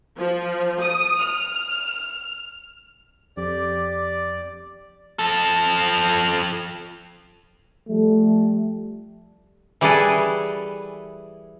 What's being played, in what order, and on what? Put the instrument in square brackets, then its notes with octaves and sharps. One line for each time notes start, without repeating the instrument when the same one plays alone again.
[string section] F3
D#6
F6
[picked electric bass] F2 [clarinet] G4 [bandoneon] D5
[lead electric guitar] F3 A4
[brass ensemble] F3 G3 A3
[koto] E3 G3 E4 G#4 A4 B4